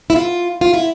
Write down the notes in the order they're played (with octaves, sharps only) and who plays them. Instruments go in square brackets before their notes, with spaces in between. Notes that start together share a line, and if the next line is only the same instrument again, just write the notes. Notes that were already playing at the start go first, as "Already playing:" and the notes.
[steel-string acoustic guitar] E4
F4
F4
E4